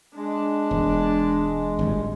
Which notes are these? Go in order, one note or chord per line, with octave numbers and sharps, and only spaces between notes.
G#3 D4
E1
G#1 A2 G3